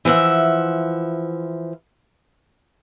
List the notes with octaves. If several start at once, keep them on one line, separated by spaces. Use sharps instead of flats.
E3 F3 E5 F#5